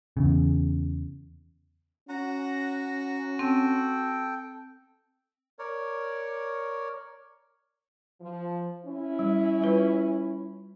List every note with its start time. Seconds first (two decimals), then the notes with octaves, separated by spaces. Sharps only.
0.17 E2 C#3
2.09 C#4 F#4 F#5 A#5
3.39 C4 A4 G5
5.59 A#4 C#5 D5
8.21 F3
8.84 C#4 E4
9.19 G3
9.61 G3 F4 B4